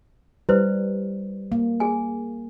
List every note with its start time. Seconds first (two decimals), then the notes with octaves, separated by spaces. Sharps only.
0.49 G3 E4 B4 C5
1.52 A#3
1.80 G#4 G#5